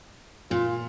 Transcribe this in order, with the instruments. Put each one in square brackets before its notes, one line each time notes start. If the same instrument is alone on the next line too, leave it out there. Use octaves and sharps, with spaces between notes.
[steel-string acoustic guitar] A#2 [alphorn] F4